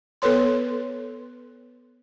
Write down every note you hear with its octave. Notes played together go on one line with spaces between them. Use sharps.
B3 A4 B4 C#5 C6